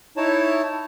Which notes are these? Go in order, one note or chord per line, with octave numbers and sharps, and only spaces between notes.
D#4 E4 C#5 A5